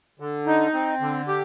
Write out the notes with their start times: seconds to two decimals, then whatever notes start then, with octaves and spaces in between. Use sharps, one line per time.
0.20 D3
0.47 D#4
0.74 C4
1.01 D3
1.28 G4